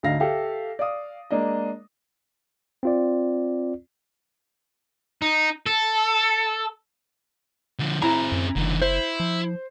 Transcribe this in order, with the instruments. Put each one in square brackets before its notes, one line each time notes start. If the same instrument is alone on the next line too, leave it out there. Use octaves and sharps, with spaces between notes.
[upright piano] D2 D3 D#4 F5 A#6
G4 A4 E5 F5
D5 F5 D#6
G#3 A#3 D4 D#5
[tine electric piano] C4 F4 D5
[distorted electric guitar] D#4
A4
D3 F3
[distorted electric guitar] C4 G#4 [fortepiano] E4 A#5
[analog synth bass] F#2
[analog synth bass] F#1 [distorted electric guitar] D3 E3
[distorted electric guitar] E4 [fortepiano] C5
[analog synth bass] F3